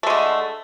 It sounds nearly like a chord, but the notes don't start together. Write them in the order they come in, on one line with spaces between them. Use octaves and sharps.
A3 G#3 D3